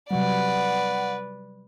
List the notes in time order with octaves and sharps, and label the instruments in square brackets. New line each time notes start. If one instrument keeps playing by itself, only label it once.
[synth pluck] C3 F#3 G3 [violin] B4 D5 [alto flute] F#5